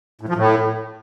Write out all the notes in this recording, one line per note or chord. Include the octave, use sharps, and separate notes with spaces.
A2
F3
A2